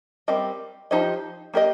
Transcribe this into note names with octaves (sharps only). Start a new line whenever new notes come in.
G3 C4 G4 A#4 D#5
F3 D#4 G4 C5 D#5
A#3 G4 A#4 D#5